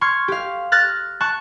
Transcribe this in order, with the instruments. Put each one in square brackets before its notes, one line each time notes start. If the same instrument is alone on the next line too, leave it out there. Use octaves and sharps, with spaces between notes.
[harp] C6 C#6 F6 G#6
G4 F5
F6 F#6 A6 A#6
A5 C#6 F#6